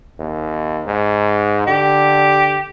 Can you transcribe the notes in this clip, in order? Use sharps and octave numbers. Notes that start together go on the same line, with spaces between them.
D#2
G#2
D3 G4